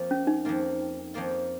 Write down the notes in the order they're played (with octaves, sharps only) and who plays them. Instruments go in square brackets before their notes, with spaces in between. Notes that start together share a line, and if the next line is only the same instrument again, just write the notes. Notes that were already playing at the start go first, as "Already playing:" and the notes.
Already playing: [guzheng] F2 F3 A#3 F4
[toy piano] C#4
D#4
[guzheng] F2 F3 A#3 F4
F2 F3 A#3 F4